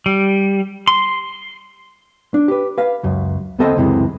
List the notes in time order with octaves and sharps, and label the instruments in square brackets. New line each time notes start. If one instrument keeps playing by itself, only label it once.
[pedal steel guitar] G3
C6
[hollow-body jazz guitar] D4
G4 B4
B4 F5
C#2 F#2
D2 B3 C4 A4 C5 D#5
C#2 F#2 C3 E3 G#3